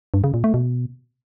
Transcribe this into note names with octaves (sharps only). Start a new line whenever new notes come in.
G2
C#3
A#2
A3
B2